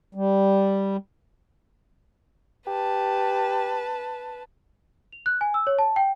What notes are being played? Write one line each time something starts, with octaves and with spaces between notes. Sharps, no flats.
G3
G4 B4 A5
F7
F#6
G#5
E6
C#5
A5
G5